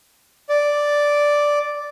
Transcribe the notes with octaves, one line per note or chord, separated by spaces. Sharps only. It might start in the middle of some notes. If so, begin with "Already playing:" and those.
D5